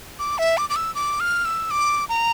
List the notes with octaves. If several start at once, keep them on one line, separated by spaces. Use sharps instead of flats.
D6
E5
D6
D6
E6
D6
F6
E6
D6
A#5